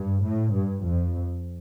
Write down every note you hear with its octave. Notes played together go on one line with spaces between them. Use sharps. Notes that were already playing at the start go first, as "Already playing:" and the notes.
Already playing: G2
A2
G2
F2